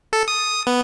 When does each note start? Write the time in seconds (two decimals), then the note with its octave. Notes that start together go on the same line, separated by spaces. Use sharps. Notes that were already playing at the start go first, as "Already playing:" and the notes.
0.13 A4
0.28 D#6
0.67 B3